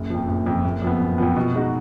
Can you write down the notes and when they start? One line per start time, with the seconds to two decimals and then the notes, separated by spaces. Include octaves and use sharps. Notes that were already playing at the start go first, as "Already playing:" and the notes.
Already playing: F#1
0.10 F2 F3
0.28 F#1
0.46 F2 F3
0.64 F#1
0.82 F2 F3 B3
1.00 F#1
1.18 F2 F3 B3
1.36 B2
1.55 G#3 D#4 F#4